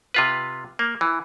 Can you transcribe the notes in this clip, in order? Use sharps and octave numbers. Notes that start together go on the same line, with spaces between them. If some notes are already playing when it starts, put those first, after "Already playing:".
C3 F4 B4
A#3
E3